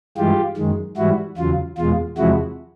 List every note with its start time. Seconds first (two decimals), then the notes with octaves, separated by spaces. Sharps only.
0.17 G2 E3 G#3 F4 G4
0.57 F#2 D#3 G#3
0.97 G#2 E3 G3 E4 F#4
1.37 E2 C#3 F#3 F4
1.78 E2 B2 G#3 F4
2.18 E2 C3 F3 G#3 E4 F#4